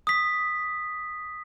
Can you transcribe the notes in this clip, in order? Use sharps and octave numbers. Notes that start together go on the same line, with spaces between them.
D#6 B6